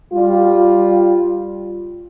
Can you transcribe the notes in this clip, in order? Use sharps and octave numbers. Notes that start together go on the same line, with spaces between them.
G3 F4